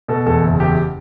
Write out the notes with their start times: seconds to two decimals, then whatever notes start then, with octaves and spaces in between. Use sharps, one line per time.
0.08 B2 A4
0.26 E2 A4
0.42 F#1
0.60 E2 G4